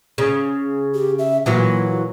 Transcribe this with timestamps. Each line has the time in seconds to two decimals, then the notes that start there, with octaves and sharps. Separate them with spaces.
0.18 C#3
0.94 G4
1.19 E5
1.46 A#2 E3 F#3 F4